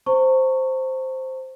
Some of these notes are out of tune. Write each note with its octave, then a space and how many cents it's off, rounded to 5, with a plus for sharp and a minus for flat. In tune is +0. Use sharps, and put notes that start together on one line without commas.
C5 +0 A#5 -45 C#6 +0